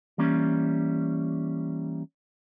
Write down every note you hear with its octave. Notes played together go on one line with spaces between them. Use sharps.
E3 G3 A#3 C#4